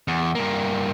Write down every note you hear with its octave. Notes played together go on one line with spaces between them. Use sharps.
E2
G2 A#3